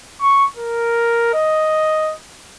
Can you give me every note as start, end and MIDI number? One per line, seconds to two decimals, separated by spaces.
0.21 0.45 85
0.57 1.31 70
1.34 2.14 75